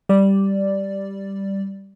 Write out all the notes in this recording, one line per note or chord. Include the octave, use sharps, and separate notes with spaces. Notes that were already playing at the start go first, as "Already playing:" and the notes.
G3 D5